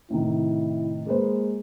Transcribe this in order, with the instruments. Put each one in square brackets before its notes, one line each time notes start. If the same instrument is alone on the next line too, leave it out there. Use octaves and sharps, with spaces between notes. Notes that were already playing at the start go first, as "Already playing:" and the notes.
[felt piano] A2 C3 D#3 [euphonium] E4
[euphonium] G#3 [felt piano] A#3 B4 C5